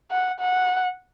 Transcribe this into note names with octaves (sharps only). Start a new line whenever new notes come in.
F#5
F#5